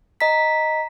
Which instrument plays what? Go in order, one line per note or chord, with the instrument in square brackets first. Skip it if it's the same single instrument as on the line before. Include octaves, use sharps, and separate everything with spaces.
[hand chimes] D#5 A#5 B6